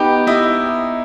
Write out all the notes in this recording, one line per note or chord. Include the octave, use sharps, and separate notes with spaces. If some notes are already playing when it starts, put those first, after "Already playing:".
Already playing: B3 D#4 G4 B4
E4 D#5